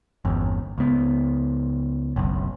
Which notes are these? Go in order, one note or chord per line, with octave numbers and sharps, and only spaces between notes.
G1 E2
C#2 B3
F#1 B1